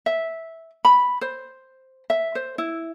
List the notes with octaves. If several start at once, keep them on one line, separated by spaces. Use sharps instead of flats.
E5
B5
C5
E5
C5
E4